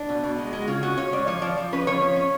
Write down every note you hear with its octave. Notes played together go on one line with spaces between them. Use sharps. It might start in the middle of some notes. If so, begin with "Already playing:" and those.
Already playing: D4
B2
B2
G#3
G#3
F#4
C#3 F4
C#4 F#4
C#4 C#5
G#3 D5
F3 C#5
F3 D5
F3
C#4 B4
F3 C#5
C#4
C#4